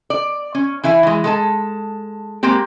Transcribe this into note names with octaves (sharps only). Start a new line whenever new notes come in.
D5
C#4
E3 E4 E5 G#5
E3 G#3
G#3 A4 A5
G#3 A#3 C4 G4